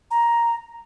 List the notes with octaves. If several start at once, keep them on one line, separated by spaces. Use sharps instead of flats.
A#5